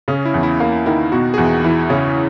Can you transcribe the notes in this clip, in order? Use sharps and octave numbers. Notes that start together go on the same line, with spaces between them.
C#3 C#4
E4
E2
E4
A#3
D#3 E4
B2 F#4
G#4
E2 F#4
E3 E4
C#3 C#4